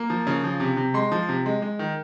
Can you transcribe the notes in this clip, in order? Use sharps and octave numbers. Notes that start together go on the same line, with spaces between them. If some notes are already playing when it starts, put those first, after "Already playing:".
Already playing: A#3
F3
C#3
F3
C3
C3
G#3 C6
F3
C3
G#3
G#3
D#3